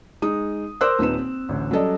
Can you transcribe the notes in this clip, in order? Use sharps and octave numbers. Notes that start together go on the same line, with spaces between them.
G#3 D#4 D#6
A#4 C5 C6 D6 E6 F#6
D#1 C4 D#4 B4 E7
C4
A1 D2
F#3 G3 C#4 A4 D5 D#5